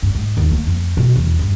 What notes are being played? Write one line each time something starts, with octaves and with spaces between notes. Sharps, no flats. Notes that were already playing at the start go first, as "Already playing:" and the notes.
G2
G#2
D#2
A#3
F2
B2
E2
G2